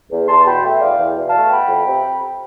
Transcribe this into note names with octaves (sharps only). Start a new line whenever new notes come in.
E2
E2 A5 C6
B2 G5 B5
A3 E5 G5
E2 D5 F5
E2
B2
F5 A5
A3
B3 G5 B5
F2
C3